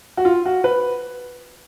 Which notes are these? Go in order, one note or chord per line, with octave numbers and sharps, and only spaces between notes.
F#4
F4
F#4
B4